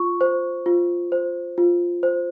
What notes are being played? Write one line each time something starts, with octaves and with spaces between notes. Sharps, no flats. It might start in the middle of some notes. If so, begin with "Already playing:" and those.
Already playing: F4 C#6
C5
F4
C5
F4
C5